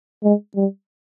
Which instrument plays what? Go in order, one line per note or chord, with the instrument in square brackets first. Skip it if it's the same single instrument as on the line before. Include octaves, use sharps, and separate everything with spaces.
[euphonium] G#3
G3